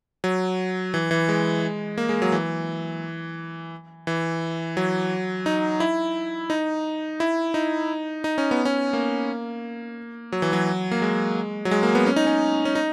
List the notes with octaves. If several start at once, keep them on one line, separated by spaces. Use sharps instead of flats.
F#3
E3
E3
G#3
A#3
G#3
F#3
E3
E3
F#3
D#4
E4
D#4
E4
D#4
D#4
C#4
B3
C#4
A#3
F#3
E3
F#3
A#3
G#3
F#3
G#3
A#3
B3
C#4
D#4
C#4
C#4
D#4